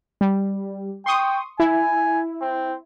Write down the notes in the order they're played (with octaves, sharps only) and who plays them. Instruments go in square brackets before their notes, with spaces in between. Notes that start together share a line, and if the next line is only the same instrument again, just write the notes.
[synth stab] G3
[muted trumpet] G5 [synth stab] C6 C#6 D#6
[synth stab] E4 [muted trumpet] G#5
[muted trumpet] C4